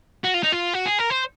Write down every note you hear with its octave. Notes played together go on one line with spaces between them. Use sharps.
F#4
F4
D#4
F4
F#4
G#4
A#4
C5